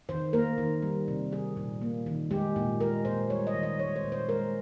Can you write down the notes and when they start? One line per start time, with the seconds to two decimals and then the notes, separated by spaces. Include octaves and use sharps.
0.09 D#3 C5
0.33 A#3 A#4
0.58 D#3
0.82 G3
1.08 C3
1.32 G3 G#4
1.57 A#2
1.82 A#3
2.06 D#3
2.31 G#3 G4
2.56 A#2
2.80 G#3 A#4
3.05 A#2 C5
3.30 G3 C#5
3.47 D#5
3.54 D#3
3.63 D#5
3.79 G#3 C#5
3.96 C5
4.04 A#2
4.12 C5
4.29 G#3 A#4